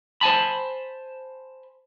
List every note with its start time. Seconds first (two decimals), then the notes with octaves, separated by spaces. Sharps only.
0.21 C5 G#5 A5 B5